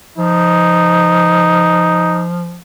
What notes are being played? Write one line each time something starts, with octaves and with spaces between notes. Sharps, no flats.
F3 D#4